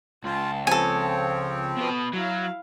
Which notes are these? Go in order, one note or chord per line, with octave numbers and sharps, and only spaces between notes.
C#2 F4 A5
F3 C4 A4 C#5 G#5
B2 B4
F#3 E4 F5